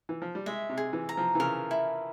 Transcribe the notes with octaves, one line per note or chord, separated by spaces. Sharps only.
E3
F3
G3
G#3 E5
C3
G#4
E3
A#5
F3
E3
C#3 A#4
E4